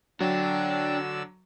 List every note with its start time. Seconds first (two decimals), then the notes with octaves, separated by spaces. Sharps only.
0.21 D3 F#3 D4 D5 G5 E6